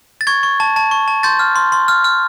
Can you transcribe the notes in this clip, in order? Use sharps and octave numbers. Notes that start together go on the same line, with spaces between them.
A6
C#6 G#6
C#6
A5
A5
C#6
A5
C6 G6 A6
F6
C6
C6
F6
F6